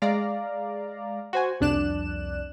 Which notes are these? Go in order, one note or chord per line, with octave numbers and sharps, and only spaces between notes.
G#3 D5 F5 A#5
F#4 C5 G#5
C2 F2 D4 D5 F#6 E7